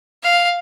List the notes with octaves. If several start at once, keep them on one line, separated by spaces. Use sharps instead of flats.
F5